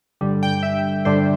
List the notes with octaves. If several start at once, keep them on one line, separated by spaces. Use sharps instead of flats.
G2 D3 G3
G5
E5
G2 D3 G3 C5